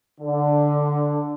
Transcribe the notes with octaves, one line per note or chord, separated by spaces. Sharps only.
D3